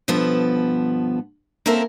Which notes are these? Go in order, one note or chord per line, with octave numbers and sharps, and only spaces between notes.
G2 B2 F3 B3 A4
A#3 C4 C#4 A4 A#4 E5